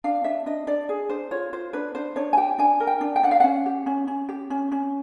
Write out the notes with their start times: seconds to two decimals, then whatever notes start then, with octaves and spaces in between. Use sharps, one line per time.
0.04 D4 F5
0.24 D4 E5
0.46 D4 D#5
0.67 D4 D5
0.89 G#4
1.09 D4 C5
1.31 F4 C#5
1.53 F4 C5
1.73 D4 B4
1.95 D4 C5
2.16 D4 C#5
2.33 G#5
2.37 G4 G5
2.58 D4 G#5
2.80 A#4
2.87 G5
3.01 D4
3.16 G5
3.23 D4 F#5
3.31 F5
3.40 C#4 F#5
3.66 G4
3.86 C#4
4.07 C#4
4.29 G4
4.50 C#4
4.72 C#4